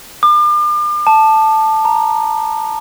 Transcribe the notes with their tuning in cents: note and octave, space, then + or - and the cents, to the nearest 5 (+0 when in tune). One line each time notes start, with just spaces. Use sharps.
D6 +40
A5 +0
A#5 +5